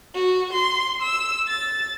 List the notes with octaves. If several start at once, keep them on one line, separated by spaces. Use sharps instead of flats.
F#4
C6
E6
A6